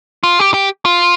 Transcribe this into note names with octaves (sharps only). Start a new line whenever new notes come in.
F4
G4
G4
F4